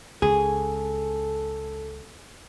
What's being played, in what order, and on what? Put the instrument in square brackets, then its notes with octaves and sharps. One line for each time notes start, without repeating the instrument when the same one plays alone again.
[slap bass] C#2 [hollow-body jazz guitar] G#4 [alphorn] A4